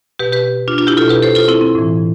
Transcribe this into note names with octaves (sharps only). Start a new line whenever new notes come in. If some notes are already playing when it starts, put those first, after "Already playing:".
B2 G4 B4
G4 B4
D4 F4
D4 F4
E4 G4
B2 F4 A4
G4 B4
A4 C5
F4 A4
C4 E4
C4
A2 E3